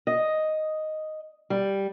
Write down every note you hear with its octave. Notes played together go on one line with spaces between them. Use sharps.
D#5
G3